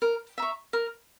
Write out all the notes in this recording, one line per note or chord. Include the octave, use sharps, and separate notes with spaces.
A#4
E5 A#5 C#6
A#4